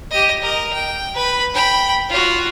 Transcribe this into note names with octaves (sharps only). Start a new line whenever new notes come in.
G4 D#5
A#4 D#5
G5
B4 B5
G5 B5
F4 F#4